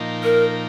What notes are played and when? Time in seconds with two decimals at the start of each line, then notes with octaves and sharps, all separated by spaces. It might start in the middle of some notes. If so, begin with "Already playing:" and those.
Already playing: A#2 F3 A#3 D#4
0.23 A#4